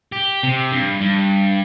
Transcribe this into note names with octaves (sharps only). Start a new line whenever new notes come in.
G4
C3
G2
G2